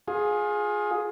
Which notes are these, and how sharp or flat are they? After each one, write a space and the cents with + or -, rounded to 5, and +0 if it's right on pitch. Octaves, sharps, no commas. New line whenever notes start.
F4 +25 G#4 +5